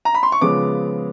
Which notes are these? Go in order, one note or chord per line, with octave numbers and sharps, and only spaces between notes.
A#5
B5
C6
C#6
C#3 F3 G#3 B3 D6